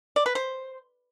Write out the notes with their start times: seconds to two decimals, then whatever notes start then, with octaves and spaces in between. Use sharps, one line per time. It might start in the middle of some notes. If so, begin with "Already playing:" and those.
0.16 D5
0.26 B4
0.35 C5